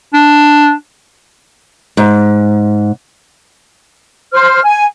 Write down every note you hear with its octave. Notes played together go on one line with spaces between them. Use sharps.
D4
G#2
C5 F6
G#5